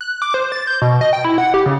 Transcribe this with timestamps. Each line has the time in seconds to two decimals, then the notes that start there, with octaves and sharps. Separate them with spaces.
0.01 F#6
0.22 D6
0.34 C5
0.52 A6
0.67 G6
0.82 B2
1.01 D#5
1.13 G5
1.25 E4
1.38 F#5
1.54 G4
1.66 C#3